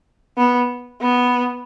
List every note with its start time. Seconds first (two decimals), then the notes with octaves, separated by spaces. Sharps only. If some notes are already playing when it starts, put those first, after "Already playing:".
0.37 B3
1.02 B3